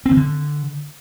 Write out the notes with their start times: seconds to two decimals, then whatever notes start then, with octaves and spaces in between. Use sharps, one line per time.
0.06 C4
0.11 D#3
0.17 D3